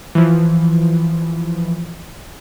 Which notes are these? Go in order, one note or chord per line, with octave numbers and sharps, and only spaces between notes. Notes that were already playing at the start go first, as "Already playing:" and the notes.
E3 F3